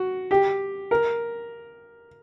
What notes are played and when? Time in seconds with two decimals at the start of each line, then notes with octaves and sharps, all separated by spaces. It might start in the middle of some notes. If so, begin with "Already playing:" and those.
Already playing: F#4
0.31 G4
0.91 A#4